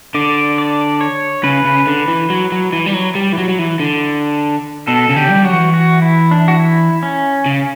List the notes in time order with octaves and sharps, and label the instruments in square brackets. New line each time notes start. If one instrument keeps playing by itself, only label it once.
[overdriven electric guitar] D3 [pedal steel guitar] D5
[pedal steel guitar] D5
C#5
[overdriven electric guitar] C#3 [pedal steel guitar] B4
[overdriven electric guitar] C#3
D3
E3
F#3
F#3
E3
G3
F#3
G3
E3
F#3
F#3
E3
D3
[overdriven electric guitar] B2 [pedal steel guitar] A4
[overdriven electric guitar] C#3
[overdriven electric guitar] D3 [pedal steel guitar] G4
[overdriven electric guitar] C#3
G3
[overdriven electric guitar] F#3 [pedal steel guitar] F#4
[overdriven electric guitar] E3
[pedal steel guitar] F#4
E4
D4
F#4
E4
C#4
[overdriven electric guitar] C#3